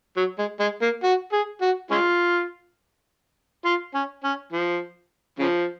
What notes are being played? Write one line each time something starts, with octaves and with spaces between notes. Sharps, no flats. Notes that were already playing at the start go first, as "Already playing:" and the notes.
F#3
G#3
G#3
A#3
F#4
G#4
F#4
G#3 C#4 F4
F4
C#4
C#4
F3
C#3 F3